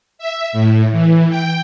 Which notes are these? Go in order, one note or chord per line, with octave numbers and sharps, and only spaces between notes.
E5
A2
E3
G5